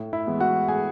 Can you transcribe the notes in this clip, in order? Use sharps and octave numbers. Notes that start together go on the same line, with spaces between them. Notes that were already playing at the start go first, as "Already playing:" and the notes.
Already playing: A2
E4 E5
E3 G#3 B3
F#4 F#5
A2 G#4 G#5